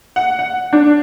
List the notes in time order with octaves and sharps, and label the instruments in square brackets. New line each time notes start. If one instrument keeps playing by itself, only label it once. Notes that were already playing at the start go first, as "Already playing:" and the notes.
[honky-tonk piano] F#5
F#5
D4